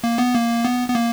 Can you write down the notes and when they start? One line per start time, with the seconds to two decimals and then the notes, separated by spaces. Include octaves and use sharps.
0.04 A#3
0.18 B3
0.34 A#3
0.65 B3
0.89 B3
0.95 A#3